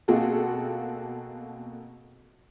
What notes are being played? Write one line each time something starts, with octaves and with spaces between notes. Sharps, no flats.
B2 A#3 C4 F#4 G#4 A4